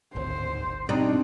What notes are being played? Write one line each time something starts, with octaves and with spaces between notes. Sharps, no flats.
D1 G#1 D2 C5
B2 G3 C4 D4 D#4